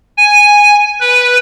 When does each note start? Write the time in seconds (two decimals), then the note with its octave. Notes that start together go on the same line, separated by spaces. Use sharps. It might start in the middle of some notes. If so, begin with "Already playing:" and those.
0.18 G#5
1.00 B4